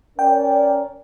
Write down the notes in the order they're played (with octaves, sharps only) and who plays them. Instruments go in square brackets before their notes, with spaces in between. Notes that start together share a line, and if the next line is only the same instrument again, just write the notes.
[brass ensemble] C#4 A#4 D5 [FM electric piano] G5